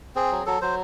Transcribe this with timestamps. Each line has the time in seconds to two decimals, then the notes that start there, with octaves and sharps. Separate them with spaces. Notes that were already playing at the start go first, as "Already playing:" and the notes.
0.15 C4 G#4
0.32 F#3
0.46 F#3 A4
0.61 F#3 C5